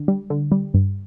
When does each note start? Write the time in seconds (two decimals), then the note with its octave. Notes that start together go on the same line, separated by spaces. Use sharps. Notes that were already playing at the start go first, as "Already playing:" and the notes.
Already playing: D3
0.08 G3
0.30 D3
0.52 G3
0.74 G2